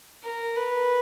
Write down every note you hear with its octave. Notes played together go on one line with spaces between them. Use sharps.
A#4
B4